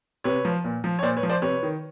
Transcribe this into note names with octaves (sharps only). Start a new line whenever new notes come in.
C3 B4 C#5
F3
A#2
F3
C#5
A#2 C5 D5
B4 C#5
F3
C5 D5
C3 B4 C#5
D#3